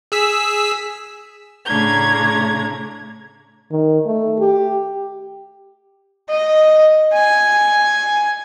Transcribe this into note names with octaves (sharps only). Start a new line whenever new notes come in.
G#4 E6 B6
A2 C#3 A3 D4 A#5 G#6
D#3
A3
G4
D#5
G#5